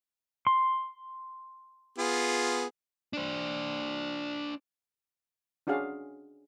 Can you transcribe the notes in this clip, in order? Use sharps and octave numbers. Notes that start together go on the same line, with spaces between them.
C6
B3 F4 G#4
D4 C5
C#4 D4 F#4 G#4 F5